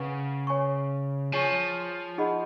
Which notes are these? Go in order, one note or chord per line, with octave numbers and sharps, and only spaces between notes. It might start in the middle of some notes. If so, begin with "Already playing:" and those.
Already playing: C#3 B4 F#5 C#6
C#5 G#5 C#6
F3 G#4 C#5 G#5 C#6
D#4 G#4 D#5 F#5 B5